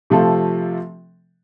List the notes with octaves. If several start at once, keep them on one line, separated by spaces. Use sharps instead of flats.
C3 F3 A3 F4 A4